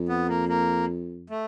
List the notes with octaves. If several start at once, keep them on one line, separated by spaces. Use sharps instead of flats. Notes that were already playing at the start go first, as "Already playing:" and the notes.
Already playing: F2
B3
A#3
A#3
A3